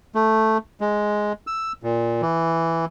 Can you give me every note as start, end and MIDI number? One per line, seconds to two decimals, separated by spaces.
0.15 0.58 57
0.81 1.33 56
1.47 1.72 88
1.83 2.22 46
2.22 2.85 52